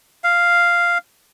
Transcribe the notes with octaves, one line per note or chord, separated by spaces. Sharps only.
F5